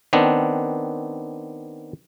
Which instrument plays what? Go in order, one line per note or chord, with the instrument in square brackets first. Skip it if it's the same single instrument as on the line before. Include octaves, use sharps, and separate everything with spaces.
[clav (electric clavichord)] D#3 B3 C4 D4